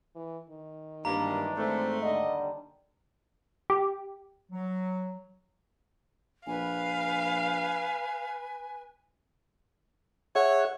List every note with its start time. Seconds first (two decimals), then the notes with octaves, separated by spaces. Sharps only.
0.15 E3
0.50 D#3
1.05 G#1 G2 E3 A#3 D4 A#5
1.57 G#2 A3 C4
2.02 D#2 D3 G3 D#5
3.70 G4
4.51 F#3
6.47 A#1 B4 F5 G#5
10.35 G#4 C#5 E5 F#5